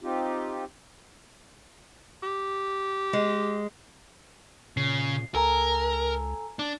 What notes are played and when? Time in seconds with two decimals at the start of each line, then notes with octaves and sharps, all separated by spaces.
0.01 C4 D#4 F4 G4
2.23 G4
3.13 G#3
4.77 A#2 C#3 C7
5.35 C#2 A4 A#4 G#5 A#5
6.59 D4